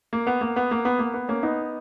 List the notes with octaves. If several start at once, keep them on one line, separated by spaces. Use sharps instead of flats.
A#3
B3
A#3
B3
A#3
B3
A#3
B3
A#3 C#4
B3 D#4